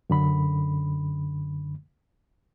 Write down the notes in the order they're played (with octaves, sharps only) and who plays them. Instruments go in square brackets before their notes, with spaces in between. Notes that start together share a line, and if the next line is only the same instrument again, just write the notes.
[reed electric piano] F#2 D3 B5